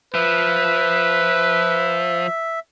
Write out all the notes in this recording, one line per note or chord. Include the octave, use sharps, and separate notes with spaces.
F3 B4 E5